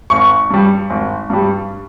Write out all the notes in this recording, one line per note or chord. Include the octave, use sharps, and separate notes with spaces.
G#1 C#6
G2 G3
G#1
G2 G3